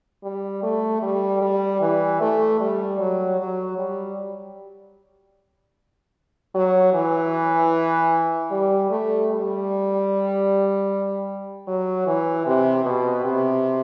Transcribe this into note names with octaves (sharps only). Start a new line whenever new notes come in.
G3
A3
G3
G3
E3
A3
G3
F#3
F#3
G3
F#3
E3
G3
A3
G3
F#3
E3
C3
B2
C3